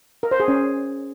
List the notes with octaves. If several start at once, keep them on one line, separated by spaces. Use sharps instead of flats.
A#4
C5
G#4
C#4